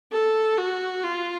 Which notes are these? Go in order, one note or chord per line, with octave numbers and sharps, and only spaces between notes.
A4
F#4
F4